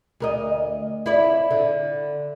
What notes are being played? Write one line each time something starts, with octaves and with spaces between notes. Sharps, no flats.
D2 A#4 D#5
E4 D5
D3